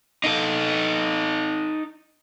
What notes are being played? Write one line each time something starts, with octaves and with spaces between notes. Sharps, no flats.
D#4 A4